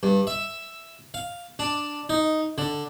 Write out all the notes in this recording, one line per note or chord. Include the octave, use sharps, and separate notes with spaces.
G2
E5
F5
D4
D#4
D3